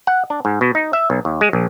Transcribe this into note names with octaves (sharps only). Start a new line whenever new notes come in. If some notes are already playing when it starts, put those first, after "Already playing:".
F#5
D4
G#2
B2
D#4
E5
B1
D#2
G#3
A#1